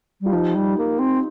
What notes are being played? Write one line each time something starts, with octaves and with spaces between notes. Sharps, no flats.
G3
F4
F3 D#4 G4
G3
A#3
C4